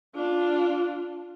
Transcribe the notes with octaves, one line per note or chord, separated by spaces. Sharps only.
D4 F4